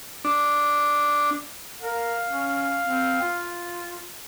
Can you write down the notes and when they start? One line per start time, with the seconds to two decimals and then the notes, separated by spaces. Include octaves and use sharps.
0.25 D4
1.82 A#4 F5
2.30 C#4
2.86 C4
3.22 F4